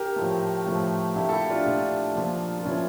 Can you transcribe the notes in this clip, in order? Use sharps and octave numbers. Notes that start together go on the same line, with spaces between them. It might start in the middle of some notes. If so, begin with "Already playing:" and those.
Already playing: G4 A#4
A2 F3 A3
A2 F3 A3
A#2 A3 E4 G4
A4
E4 G4
D4 F4
A#2 A3
A#2 F3 A#3
F4
A#2 F3 A#3 C#4 E4